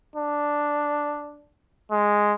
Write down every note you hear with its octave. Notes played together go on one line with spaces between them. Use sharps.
D4
G#3